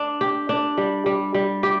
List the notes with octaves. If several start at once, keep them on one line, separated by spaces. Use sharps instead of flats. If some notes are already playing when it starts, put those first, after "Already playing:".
Already playing: D4
G4
D4
G3
G3
G3
G4